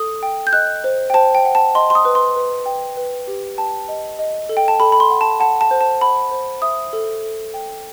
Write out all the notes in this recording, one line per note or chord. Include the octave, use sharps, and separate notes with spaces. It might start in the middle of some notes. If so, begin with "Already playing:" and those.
Already playing: A4 D#6
G5
G6
D#5 F#6
C5
G5
C5 A5
G5
F#5
A5
D#5 C6
C6
D#6
B4
C6
B4
G5
B4
G4
G5 A5
D#5
D#5
A4
G5
A5
A4 B5
B5
C6
F#5
A5
F#5 A5
A5
C5
A5
F#5 B5
C5
E5 D#6
A4
A4
G5